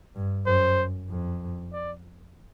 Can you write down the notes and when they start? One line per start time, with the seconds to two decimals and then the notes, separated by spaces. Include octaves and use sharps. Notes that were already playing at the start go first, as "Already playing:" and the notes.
0.16 G2
0.46 F#2 C5
1.10 F2
1.73 D5